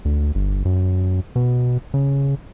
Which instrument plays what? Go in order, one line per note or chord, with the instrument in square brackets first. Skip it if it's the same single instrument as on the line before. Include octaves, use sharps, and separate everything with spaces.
[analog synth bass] D2
G1
F#2
B2
C#3